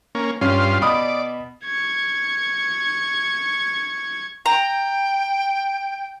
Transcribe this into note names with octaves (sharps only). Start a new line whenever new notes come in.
A#3 C#4
G2 C#4 F4 C6
B2 D5 B5 D#6
C#6 G#6
G5 A#5